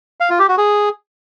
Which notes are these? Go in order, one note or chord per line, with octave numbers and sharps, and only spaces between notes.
F5
F4
G4
F#4
G#4